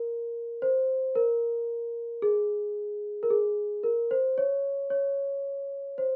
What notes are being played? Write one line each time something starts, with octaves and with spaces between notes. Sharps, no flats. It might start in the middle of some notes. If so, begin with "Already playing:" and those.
Already playing: A#4
C5
A#4
G#4
A#4
G#4
A#4
C5
C#5
C#5
C5